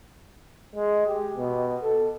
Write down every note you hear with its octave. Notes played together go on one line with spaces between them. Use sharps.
G#3
G4
B2
A4